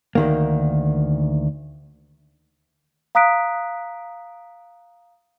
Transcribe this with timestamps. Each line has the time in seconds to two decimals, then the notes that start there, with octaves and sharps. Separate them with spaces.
0.15 D2 D#3 A#3
3.15 F5 A#5 D#6 F#6 B6 D7